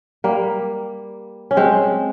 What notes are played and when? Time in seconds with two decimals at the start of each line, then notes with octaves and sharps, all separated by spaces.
0.24 G3 A#3
1.51 C#4
1.57 G#3 C4